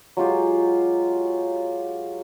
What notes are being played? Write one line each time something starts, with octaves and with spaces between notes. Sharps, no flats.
F#3 G#3 F4 G4